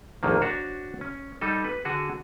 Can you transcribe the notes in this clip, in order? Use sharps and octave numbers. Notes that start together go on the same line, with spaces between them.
A#1 F2 D#3 A#3
D4 F#4 C5 C#5
C#4
G3 D#4 A4
B4
D3 F#4 G#4